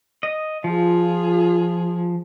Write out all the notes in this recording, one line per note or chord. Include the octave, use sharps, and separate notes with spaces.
D#5
F3 F4 G#4